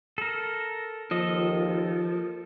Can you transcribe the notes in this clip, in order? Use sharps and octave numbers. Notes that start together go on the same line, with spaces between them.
A4 A#4
D#2 F3 A4 D#5